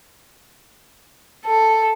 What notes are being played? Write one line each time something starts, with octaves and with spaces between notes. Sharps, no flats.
A4